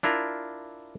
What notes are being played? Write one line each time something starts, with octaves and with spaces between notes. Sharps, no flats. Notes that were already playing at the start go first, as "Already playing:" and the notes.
D4 E4 F4 A#4